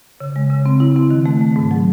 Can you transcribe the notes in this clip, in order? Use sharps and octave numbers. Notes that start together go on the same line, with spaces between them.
C#3
G#3
C#3
C4
E4
C4
D#3
A3
A3
G#2
F#3